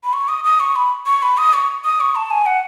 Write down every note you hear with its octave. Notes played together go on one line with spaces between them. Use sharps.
B5
C#6
D#6
D#6
C#6
B5
C#6
B5
D#6
C#6
D#6
C#6
A5
G#5
F#5